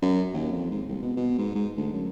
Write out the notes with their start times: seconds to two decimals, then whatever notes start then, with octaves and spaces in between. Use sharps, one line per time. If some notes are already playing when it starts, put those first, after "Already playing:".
0.02 F#2
0.34 D#2
0.52 F2
0.71 G#2
0.88 C2
1.02 B2
1.17 B2
1.38 G#2
1.55 G#2
1.77 D2
1.93 F#2